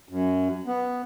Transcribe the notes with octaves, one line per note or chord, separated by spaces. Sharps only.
F#2
B3